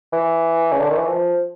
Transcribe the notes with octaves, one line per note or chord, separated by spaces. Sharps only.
E3
C#3
D3
D#3
E3
F3